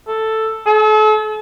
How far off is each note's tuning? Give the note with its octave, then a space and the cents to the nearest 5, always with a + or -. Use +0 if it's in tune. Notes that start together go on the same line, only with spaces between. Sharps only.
A4 +5
A4 -40